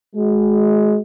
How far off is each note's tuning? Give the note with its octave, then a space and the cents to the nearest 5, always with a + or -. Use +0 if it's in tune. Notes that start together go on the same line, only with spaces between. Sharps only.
G#3 +25 F#4 +0